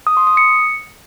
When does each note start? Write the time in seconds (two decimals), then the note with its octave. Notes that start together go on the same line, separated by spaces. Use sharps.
0.07 D#6
0.17 C6
0.27 D#6
0.37 C#7